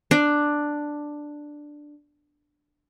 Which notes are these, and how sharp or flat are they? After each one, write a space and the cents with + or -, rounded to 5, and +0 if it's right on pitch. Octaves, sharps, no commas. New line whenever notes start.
D4 +5